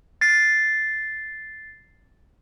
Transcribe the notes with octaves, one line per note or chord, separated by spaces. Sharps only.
A6 C7